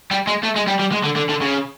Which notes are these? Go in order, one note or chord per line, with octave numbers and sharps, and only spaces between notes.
G3
G#3
A3
G#3
G3
G3
G#3
D3
D3
D3
C#3